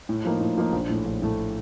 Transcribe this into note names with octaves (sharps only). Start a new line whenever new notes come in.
A2
F3 A#3 D#4
A2
F3 A#3 D#4
A#1
A2 A3
A#1
A2 A3